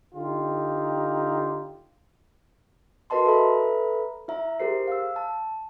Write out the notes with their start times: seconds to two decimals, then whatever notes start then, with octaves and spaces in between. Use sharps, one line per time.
0.14 D3 D#4 F4 G4
3.10 F#4 A#4 B4 D#5 A5 C6
3.25 A4 B4 E5 A#5 B5
4.28 E4 E5 A#5
4.60 G4 G#4 A#4 C5 C7
4.87 F5 E6
5.16 A5